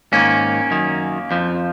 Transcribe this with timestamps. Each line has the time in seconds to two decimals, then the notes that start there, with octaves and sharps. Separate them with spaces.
0.12 G#2 D#3 A#3 C#4
0.71 F#2 D#3
1.31 F2 F3